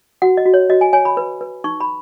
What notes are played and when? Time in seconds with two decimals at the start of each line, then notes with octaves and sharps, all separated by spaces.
0.22 F#4 F#5
0.37 D#5
0.46 F#4
0.54 C#5
0.70 F#4 D#5
0.81 G#5
0.93 C#5 G#5
1.05 B5
1.17 B4
1.41 B4
1.64 D#4 C#6
1.80 B5